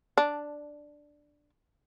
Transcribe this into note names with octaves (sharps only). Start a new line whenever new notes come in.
D4